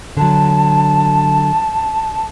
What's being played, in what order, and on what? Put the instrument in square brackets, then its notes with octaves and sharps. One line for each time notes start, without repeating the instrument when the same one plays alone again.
[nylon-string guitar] D3 F#3 [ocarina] A5